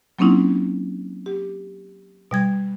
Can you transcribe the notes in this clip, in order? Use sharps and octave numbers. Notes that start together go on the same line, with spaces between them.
F#3 A#3 C4 C#4 D#4 E4
G4
B2 G3 G#6